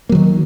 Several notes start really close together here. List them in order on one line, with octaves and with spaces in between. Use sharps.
A#3 F#3 D#3